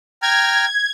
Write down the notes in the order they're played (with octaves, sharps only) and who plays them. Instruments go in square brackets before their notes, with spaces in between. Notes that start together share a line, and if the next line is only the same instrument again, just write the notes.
[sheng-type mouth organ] G5 A#5 F6 [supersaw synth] G#6